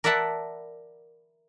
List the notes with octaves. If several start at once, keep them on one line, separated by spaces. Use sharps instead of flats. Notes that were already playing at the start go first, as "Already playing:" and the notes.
A#4 D5 E5 F#5 A5 B5